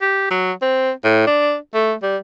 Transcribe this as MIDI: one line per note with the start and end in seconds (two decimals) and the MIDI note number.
0.01 0.31 67
0.31 0.52 54
0.62 0.91 60
1.04 1.24 45
1.27 1.56 62
1.74 1.94 57
2.02 2.17 55